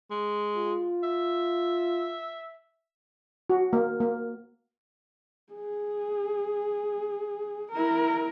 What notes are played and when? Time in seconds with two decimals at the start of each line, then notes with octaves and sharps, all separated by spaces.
0.11 G#3
0.57 F4
1.03 E5
3.50 F#4
3.73 A#3
4.00 A#3
5.53 G#4
7.71 E4 A#4